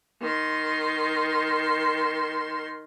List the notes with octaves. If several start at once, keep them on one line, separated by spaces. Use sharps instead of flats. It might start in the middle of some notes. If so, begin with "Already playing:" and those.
D#3 C6